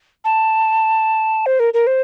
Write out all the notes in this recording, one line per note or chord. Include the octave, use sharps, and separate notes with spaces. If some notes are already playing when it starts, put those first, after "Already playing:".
A5
C5
A#4
A#4
C5